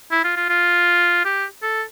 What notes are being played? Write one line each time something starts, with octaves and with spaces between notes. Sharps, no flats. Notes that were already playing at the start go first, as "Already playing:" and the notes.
E4
F4
F4
F4
G4
A4